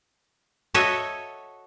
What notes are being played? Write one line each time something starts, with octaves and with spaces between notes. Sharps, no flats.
F#4 A4 C#5 D#5 E5